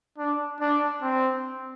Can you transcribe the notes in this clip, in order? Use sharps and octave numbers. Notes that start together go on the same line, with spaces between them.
D4
D4
C4